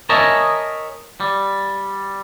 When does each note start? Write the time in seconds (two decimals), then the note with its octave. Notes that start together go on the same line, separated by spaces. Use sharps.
0.09 A#4 C#5 D#5 E5 G#5 A5
1.20 G3